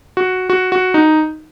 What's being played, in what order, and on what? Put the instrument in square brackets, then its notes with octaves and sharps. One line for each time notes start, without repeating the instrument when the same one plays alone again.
[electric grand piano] F#4
F#4
F#4
D#4